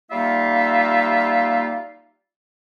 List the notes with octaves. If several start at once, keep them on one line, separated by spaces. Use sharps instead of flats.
G3 A#3 D#4 F4 E5 F5